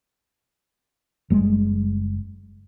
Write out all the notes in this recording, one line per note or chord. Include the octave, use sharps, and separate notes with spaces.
F#1 G3 G#3